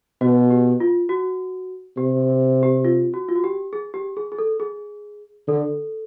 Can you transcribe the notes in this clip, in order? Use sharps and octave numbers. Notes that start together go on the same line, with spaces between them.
B2 F#4
G4
F4
F#4
C3 G4
G4
F4
F#4
F4
F#4
G4
G#4
G4
G#4
G#4
A4
G#4
D3 A4